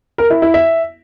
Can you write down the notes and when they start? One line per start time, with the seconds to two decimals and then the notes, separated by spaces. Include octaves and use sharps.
0.18 A#4
0.30 E4
0.42 E4
0.54 E5